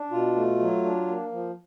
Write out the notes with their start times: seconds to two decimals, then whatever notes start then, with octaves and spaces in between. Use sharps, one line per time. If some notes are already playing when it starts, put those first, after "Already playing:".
Already playing: D4
0.11 B2 F4
0.36 A3
0.60 F#3
0.84 D4
1.07 A#3
1.32 F3